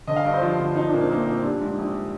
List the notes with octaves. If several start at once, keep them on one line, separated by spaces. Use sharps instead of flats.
D3 D#5
F5
G2 D#5
C5
F3 F4
G1
F3 D#4
D4
A#2 A#3
C4
A#1 A#3
A#1 C4
G3 D4
G#2
A#1